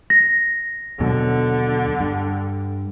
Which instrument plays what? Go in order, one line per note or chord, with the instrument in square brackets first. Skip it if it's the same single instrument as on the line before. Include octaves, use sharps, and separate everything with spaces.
[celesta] A#6
[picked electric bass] D#2 B2 F#3 [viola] D3
[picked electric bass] G2